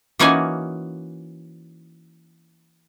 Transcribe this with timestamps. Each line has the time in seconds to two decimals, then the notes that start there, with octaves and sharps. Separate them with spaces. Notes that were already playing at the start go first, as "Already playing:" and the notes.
0.19 E3 A#3 C#4 D#4 F#4 G#5